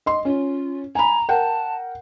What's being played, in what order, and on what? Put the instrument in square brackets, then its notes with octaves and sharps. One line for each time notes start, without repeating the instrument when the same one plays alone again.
[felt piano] D#5 C6
[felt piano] C#4 [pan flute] F4
[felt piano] G#5 B5 [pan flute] A#5
[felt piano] A#4 F#5 G5 [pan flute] A5